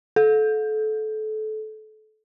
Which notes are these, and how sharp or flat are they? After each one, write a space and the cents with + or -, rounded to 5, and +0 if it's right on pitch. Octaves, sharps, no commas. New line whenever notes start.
A4 -25